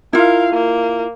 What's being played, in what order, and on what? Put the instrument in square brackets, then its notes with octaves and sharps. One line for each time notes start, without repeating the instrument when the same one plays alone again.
[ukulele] E4 F4 [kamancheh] A#4 F5
[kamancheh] A#3